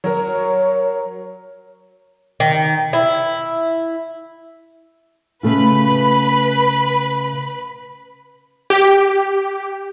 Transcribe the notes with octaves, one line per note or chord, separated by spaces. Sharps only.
F#3 A#4
C#5
D#3
E4
C#3 A3 F4 B4 B5
G4